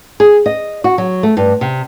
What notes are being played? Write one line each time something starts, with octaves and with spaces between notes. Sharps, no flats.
G#4
D#5
F#4
F#3
A3
G2
C3